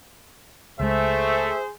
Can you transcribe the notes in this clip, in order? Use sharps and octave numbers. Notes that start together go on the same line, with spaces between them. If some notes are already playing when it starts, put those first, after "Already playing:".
C#2 G#3 A3 G#4 C5 E5